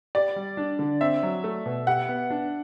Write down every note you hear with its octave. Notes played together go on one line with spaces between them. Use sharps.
G4 D5
G3
D4
D3
C4 E5
F#3
A3
B2
G4 F#5
B3
D4